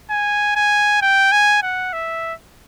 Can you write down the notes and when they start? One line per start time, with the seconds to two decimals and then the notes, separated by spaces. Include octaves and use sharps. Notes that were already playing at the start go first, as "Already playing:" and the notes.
0.10 G#5
0.56 G#5
1.02 G5
1.32 G#5
1.63 F#5
1.93 E5